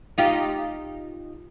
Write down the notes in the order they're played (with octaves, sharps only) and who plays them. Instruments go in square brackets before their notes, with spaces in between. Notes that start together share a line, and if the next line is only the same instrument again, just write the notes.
[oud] D#4 F4 G4